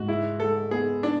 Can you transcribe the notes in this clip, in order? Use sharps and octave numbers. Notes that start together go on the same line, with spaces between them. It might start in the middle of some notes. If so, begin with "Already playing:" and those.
Already playing: G#2 F#4
G#3 E4
G#3 A4
B3 G#4
D4